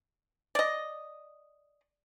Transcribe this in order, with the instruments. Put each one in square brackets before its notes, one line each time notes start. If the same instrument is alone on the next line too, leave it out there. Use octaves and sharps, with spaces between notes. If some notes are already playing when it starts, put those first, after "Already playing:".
[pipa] D5 D#5